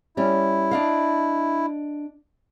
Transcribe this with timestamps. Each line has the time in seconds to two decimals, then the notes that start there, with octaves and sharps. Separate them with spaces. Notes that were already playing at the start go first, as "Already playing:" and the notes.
0.17 G3 C#4 E4
0.71 D4 D#5 F5